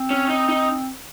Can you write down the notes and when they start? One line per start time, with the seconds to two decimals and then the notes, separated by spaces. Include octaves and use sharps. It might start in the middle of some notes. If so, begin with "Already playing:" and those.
Already playing: C4
0.11 C#4
0.30 D#4
0.49 D#4